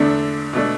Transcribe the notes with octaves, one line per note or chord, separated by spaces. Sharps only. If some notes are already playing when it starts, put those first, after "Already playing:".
Already playing: E2 D3 A3 D4
B2 A3 D4